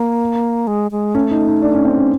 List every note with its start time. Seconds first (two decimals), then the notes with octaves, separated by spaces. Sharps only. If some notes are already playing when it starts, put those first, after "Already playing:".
Already playing: A#3
0.67 G#3
0.91 G#3
1.15 A3 C#4
1.31 D#4
1.47 D#4
1.62 D4
1.75 C#4
1.85 C4
1.98 C#4